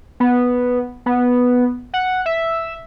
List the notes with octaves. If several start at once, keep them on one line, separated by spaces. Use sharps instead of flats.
B3
B3
F#5
E5